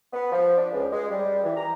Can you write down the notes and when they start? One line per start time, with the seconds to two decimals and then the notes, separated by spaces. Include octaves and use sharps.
0.13 B3
0.32 F3
0.58 D4
0.73 C#2
0.93 G#3
1.10 G3
1.44 E3
1.57 A#5